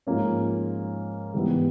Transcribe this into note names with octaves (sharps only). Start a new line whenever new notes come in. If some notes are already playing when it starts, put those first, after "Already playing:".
G#2 F3 A#3 C#4
G#2 E3 G3 B3 E4